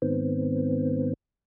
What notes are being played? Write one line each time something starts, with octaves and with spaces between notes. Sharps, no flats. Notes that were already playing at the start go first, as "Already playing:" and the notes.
G#2 D#3 B3 C4